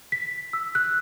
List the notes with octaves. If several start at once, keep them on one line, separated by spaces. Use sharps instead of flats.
B6
E6
F#6